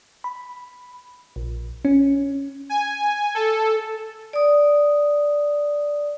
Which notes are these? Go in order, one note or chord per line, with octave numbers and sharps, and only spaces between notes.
B5
A#1
C#4
G#5
A4
D5 D#6